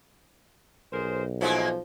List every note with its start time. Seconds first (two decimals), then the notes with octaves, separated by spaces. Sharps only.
0.93 B1 G#4 A#4 C5
1.41 F3 F#3 G#3 A#3 D#4 E4